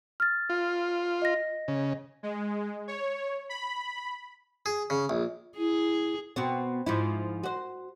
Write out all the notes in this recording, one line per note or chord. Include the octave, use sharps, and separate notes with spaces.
F6 A6
F4
D#5 A#6
C#3
G#3
C#5
B5
G#4
C#3
A#1
E4 G#4
B2 B3 C4
G#2 F3 E4
F#4 C5